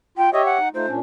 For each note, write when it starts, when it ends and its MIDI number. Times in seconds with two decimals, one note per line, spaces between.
0.18 0.28 65
0.18 0.30 79
0.33 0.58 67
0.33 0.58 73
0.33 0.45 75
0.33 0.58 76
0.46 0.69 78
0.59 0.69 63
0.75 0.86 57
0.75 0.86 63
0.75 0.86 65
0.75 0.91 72
0.88 1.00 46
0.88 1.00 61
0.88 1.00 62